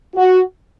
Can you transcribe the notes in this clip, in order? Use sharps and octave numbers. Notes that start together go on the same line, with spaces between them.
F#4